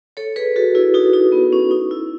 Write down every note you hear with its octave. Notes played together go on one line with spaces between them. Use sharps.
A4 C#5
G#4 B4
F#4 A4
E4 G#4
D#4 F#4
D#4
B3
C#4
D#4
E4